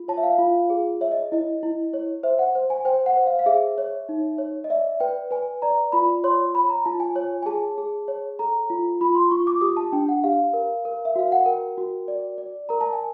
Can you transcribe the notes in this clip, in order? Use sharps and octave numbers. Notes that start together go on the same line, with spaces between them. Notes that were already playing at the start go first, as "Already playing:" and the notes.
Already playing: F4
C#5 A5
E5
F5
F4
G#4
C#5 E5
D#5
E4 D#5
E4
C#5
C5 E5
F#5
C5
G#5
C5 G5
F#5
C5
F5
F5
G#4 E5
C#5
D#4
C#5
D#5
D5 E5
B4 G5
B4 G#5
D5 A#5
F4 B5
C#5 C6
C#5 B5
A#5
F4 A5
G#5
C#5 G#5
G#5
G#4 A5
G#4
C#5
A4 A#5
F4
F4 B5
C6
F4 C#6
D6
G4 D#6
A5
D4 G5
F#5
G4 F5
A#4
A#4
E5
F#4 F5
F#5
A#4 G5
F#4
D5
D5
A#4 A#5
A5
G#5